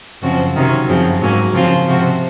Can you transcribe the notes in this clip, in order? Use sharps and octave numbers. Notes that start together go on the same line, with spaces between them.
F#2 C#3 F3 C4 F#4
C3 D#3 F#3 C#4
F#2 C#3 F3 C4
G#2 F#3 A#3 C#4
C#3 F3 C4 F4
C3 F3 C4 F#4